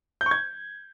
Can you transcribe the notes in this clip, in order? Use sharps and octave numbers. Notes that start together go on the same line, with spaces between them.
G6
C#6
G#6